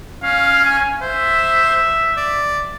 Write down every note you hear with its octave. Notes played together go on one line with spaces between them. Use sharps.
C#4 F5
G#5
C5 E5
D5